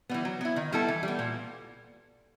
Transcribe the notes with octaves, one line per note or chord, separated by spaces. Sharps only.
E3 G3 B3
F#3
B3 E4
D#3
G3 B3 E4 A4
E3
G3 B3
A#2